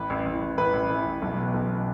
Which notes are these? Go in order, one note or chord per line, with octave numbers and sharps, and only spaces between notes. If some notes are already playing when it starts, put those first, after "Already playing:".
Already playing: A1 B4
A1
A1
A1
A1 B4
A1
E3
A1
B1
B2
B1